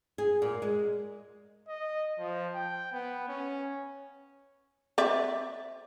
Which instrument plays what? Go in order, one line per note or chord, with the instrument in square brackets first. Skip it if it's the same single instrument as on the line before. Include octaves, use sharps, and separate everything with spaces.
[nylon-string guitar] G#4
A#2
G#3
[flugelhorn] D#5
F3
G5
B3
C#4
[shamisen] C4 D5 E5